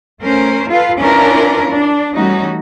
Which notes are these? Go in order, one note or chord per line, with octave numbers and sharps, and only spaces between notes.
A3 C#4 A#4 C5
F4 A4 B4 F5
C#4 D4 E4 F4 A#4 B4
D4
E3 G3 A3 C#4 D#4 F#4